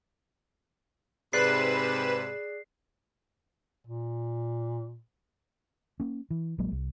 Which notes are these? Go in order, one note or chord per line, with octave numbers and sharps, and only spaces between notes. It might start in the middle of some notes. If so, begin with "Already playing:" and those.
G#2 C3 G#4 B4 D5 F#6 C7 E7
A#2
A#3 C#4
E3
A#1 F#3 G#3 A#3
C2